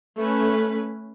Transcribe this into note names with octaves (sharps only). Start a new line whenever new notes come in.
A3 C#4 B4